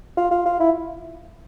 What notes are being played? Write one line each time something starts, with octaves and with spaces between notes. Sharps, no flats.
F4
F4
F4
E4